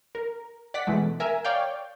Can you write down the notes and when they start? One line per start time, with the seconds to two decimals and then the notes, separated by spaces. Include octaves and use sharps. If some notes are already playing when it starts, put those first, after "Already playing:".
0.15 A#4
0.74 D5 F#5 B6
0.87 B2 E3 G#3 A3
1.20 A#4 E5 G#5
1.45 C#5 D5 F5 G5